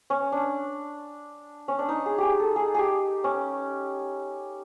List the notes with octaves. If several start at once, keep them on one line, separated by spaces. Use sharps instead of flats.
C#4
D4
C#4
D4
D#4
G#4
G4 G#4
A4
G#4
G4 G#4
C#4